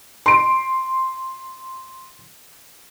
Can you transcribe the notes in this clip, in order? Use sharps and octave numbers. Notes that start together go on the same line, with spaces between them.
C6 D7